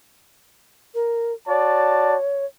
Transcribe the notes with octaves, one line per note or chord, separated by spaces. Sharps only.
A#4
F#4 C#5 D5 A5